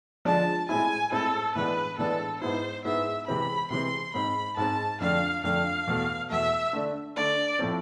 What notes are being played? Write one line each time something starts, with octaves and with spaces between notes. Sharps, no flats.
D3 F3 G#3 D4 A5
A2 G#3 C4 E4 G#5
A2 G#3 C4 E4 A4
A2 E3 G#3 B3 D4 B4
A2 E3 G#3 B3 D4 A4
G#2 G#3 B3 E4 C5
G#2 G#3 B3 E4 E5
C3 E3 G#3 C4 B5
C3 E3 G#3 C4 C6
G#2 G#3 C4 B5
G#2 G#3 C4 A5
F2 D3 A3 D4 F5
F2 D3 A3 D4 F5
E2 B2 A3
E2 B2 A3 E5
D3 A3 D4
D3 A3 D4 D5
A2 F3 A3 C4